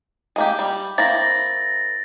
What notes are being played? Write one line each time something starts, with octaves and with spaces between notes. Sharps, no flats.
G#3 A#3 G4
G3
A#3 C4 E4 A6 A#6